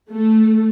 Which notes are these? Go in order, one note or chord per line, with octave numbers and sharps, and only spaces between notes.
A3